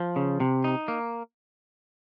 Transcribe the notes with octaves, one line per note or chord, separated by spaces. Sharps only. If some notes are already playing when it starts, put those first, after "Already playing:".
Already playing: F3
C#3
C3
D#4
A#3